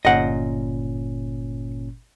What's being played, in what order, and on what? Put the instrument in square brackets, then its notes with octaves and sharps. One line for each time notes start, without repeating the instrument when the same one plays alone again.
[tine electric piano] G1 A#2 C#4 [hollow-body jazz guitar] D#5 F#5